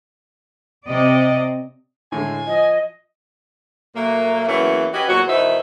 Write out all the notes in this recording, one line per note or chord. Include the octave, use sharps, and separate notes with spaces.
C3 D5 D#5
A2 D3 G#3 G#5
F3 D#5
A#2 F#3 A3 A#3
E2 E3 F#3 A3 A#3 C#4
C#4 F#4 G4 B4 D#5
E2 A#2 F#3 F#4
B2 D#3 E3 D#4 C5 E5